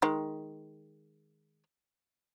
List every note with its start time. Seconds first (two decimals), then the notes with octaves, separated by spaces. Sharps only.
0.02 D#3 G#3